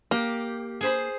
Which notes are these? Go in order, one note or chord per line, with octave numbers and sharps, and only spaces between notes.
A#3 G4
G#4 C5 B5